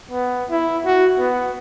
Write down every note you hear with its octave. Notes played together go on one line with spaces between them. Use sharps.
B3
E4
F#4
B3